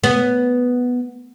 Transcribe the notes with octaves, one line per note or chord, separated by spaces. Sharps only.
B3